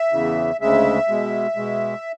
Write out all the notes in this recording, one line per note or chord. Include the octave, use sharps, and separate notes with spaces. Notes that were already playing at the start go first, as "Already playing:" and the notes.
Already playing: E5
E2 C#3 E3
D2 C#3 G#3 E5
B2 G#3
B2 G#3